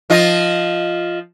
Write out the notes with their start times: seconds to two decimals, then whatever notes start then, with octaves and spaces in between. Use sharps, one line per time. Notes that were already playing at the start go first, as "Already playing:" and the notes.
0.10 F3 F4 D#5